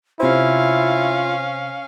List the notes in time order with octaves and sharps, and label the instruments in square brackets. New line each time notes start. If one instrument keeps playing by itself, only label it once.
[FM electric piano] C3 C5 [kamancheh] C#4 F5 [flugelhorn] E4 [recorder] F4